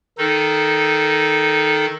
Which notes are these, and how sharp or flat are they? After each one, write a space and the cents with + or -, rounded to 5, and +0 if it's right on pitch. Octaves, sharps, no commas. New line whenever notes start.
D#3 +0 D#4 +0 A4 -10